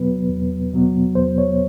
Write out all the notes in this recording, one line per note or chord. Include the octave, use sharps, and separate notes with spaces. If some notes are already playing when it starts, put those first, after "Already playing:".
Already playing: E2 B2 F#3 B3 B4
E2
B2 F#3 B3
E2 C5
C#5